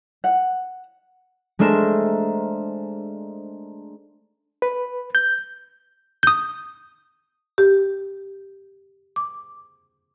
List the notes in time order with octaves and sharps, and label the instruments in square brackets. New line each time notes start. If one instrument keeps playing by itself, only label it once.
[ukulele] F#5
[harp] G#3 A3 D4 A#4 C5 E7
[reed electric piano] B4
G6
[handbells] D#6 G6
[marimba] G4
D6